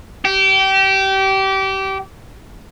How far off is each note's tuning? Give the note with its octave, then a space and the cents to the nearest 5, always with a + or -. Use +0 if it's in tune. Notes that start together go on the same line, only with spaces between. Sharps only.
G4 -25